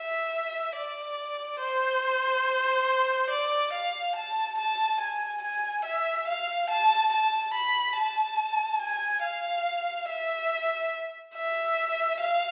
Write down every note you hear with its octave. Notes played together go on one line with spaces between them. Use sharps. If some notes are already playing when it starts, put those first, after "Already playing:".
Already playing: E5
D5
C5
D5
F5
A5
A5
G#5
G#5
E5
F5
A5
A5
B5
A5
G#5
F5
E5
E5
F5